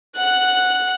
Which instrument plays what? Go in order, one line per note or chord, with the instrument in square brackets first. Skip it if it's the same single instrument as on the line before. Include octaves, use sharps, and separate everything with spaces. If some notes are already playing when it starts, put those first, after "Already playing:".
[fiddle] F#5 F#6